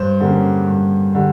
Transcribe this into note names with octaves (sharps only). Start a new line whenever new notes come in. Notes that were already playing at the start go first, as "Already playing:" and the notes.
Already playing: G2 C5
D3 G3 A#3 C#4
G2
D3 G3